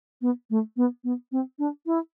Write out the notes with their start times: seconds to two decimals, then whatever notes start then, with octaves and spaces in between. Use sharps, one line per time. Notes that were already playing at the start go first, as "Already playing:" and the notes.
0.22 B3
0.50 A3
0.77 B3
1.04 B3
1.32 C4
1.59 D4
1.86 E4